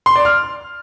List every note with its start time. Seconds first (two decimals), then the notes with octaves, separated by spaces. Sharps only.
0.06 C6
0.16 D5
0.25 F6